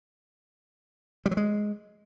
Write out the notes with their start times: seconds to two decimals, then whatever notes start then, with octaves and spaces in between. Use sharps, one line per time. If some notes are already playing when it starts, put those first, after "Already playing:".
1.26 G3
1.31 F#3
1.37 G#3